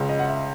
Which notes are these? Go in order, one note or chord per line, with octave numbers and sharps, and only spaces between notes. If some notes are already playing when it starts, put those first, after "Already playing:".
Already playing: C#2 C#3 G#3
D#5
F#5
E5